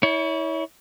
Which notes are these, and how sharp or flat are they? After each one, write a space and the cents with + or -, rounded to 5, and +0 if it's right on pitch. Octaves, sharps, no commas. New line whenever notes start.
E4 -30 C#5 +25